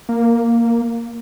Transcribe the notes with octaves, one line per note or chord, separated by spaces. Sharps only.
A#3